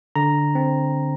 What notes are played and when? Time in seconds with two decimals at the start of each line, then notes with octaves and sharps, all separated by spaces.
0.16 D3 A#5
0.55 C4